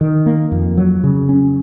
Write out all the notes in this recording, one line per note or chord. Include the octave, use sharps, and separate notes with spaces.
D#3
A#3
F2
F#3
C#3
C#4